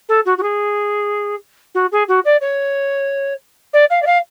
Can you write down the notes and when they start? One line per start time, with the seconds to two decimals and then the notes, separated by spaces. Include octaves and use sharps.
0.08 A4
0.25 F#4
0.37 F#4
0.42 G#4
1.74 F#4
1.92 G#4
2.08 F#4
2.25 D5
2.41 C#5
3.73 D5
3.90 F5
4.02 D5
4.06 F5